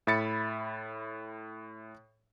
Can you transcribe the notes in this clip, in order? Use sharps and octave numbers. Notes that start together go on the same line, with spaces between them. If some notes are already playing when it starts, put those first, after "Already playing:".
A2 E5 B5 A6 C#7